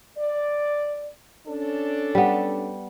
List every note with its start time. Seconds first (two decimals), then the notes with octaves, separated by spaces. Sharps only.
0.16 D5
1.47 C#4 D4 A4
2.15 G3 B3